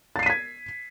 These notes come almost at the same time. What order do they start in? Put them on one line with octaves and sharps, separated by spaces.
A6 C7 D#7 B6 G#6